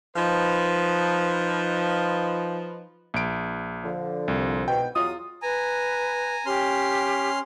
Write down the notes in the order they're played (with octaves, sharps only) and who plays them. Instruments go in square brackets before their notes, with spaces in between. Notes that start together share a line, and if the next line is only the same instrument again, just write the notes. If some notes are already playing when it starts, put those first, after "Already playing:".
[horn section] F3 D#4 B4
[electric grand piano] A#1 D7
[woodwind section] D3 F3
[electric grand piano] C2
[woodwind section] G#2 B2 [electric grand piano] G5
[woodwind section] E2 F#3 D#6 [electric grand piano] F4
[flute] B4 [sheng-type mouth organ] G#5 A#5
[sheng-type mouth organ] C#4 C6 F6 [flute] G4